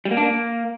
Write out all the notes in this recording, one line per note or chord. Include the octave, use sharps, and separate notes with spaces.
G3
A#3
D4
A#3